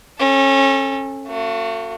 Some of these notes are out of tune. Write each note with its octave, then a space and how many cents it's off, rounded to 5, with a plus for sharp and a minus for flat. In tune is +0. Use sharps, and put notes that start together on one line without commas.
C#4 -30 A4 +0
A3 +40 F#4 -20